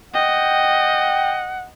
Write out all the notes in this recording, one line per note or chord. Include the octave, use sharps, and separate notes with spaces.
D#5 F#5 G5